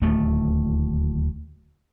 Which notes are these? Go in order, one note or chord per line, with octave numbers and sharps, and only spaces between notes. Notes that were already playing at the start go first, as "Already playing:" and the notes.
D1 D#2 A3